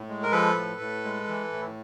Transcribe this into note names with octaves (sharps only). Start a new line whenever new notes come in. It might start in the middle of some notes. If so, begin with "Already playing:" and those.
Already playing: A2
G#3
A#4
F3 A4 B4
A2
A2
G#3
E3
A2